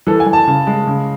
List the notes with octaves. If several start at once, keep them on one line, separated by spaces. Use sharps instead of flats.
E3 A4
G#5
E3
A5
C#3
G#3
C#3